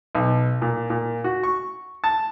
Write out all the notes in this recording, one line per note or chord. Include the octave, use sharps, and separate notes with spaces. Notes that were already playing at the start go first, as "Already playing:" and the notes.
B1
A#2
A#2
F#4
C#6
A5